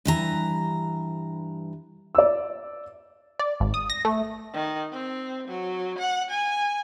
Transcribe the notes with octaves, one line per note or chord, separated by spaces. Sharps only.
G2 E3 A#5
D5 E6
D5
G#1
D#6
A#6
A3
D#3
C4
F#3
F#5
G#5